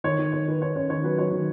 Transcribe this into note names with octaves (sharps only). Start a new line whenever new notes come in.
D#3 C#5
D#3
D#3 C#5
D#3 B4
D#3 C#5
C#4 C#5
D#3 C#5
F#3 B4
F#3 C#5
D#3